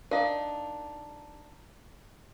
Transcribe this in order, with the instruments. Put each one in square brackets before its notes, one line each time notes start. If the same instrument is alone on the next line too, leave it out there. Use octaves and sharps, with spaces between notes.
[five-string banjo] D4 D#4 [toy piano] A#4 F5